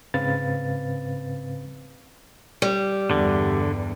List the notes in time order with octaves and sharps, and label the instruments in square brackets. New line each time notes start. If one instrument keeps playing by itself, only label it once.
[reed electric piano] G#2 C#3 C4 B4 F5 A6
[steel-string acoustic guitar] G3
[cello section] E2 G2 [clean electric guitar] D3